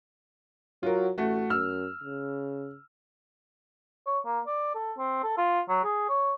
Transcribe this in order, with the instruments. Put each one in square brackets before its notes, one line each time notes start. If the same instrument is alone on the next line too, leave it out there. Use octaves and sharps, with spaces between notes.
[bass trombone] F#3 [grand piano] F4 F#4 A#4
[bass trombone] A1 [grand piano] A3 F#4
[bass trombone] F#2 [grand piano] E6 F6
[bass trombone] C#3
[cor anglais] C#5
A#3
D5
A4
C4
A4
F4
F#3
G#4
C#5